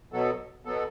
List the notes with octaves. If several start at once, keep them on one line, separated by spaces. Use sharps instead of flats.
B2 F#3 B3 A4
B2 F#3 B3 A4